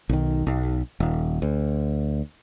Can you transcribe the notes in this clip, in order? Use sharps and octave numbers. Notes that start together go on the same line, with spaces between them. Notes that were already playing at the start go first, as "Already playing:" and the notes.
B1 D#3
B1
D#1
D2